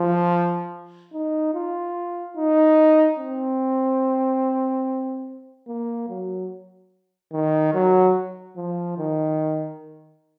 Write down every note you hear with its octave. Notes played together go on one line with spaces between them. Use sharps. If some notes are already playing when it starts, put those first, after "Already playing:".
Already playing: F3
D#4
F4
D#4
C4
A#3
F#3
D#3
F#3
F3
D#3